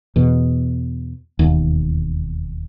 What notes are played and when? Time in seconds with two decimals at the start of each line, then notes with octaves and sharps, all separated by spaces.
0.16 E2 B2
1.39 E1 D#2